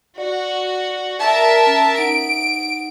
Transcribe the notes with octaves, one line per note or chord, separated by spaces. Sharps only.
F#4 D5
A#4 E5 A5
C#4
D#4 F#5 D7